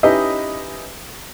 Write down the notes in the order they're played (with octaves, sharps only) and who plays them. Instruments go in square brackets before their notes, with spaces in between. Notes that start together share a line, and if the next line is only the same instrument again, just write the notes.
[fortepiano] C#4 D#4 E4 G4 B4 D#5